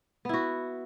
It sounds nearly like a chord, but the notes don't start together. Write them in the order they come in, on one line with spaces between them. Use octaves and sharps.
B3 E4 F#4